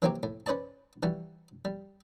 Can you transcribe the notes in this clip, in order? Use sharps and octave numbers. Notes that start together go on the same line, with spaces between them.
E3 F#3 A#3 C4 F#4 G4
A2
C#4 B4 C5 D5 A5
E3 G3 F#4
G3